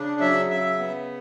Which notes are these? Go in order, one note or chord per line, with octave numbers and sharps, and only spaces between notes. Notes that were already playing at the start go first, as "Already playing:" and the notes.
Already playing: C#3 D4
F#3 E5
C#3 E5
B3